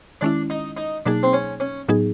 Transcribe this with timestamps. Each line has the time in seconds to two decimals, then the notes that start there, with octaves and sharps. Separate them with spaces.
0.21 D#3 G#3 C#4 D4 E4
0.50 D#4
0.77 D#4
1.06 B2 F#3 A#3 D4 D#4 G#4
1.23 C4
1.33 C#4
1.60 C#4
1.88 A2 F#3 B3 D#4 G#4